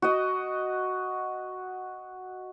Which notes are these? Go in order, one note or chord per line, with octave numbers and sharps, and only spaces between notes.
F#4 D#5